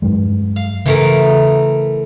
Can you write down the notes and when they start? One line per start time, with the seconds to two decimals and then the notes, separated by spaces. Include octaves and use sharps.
0.02 G2 F#3 G#3
0.56 F5
0.86 C#3 E3 A3 A#4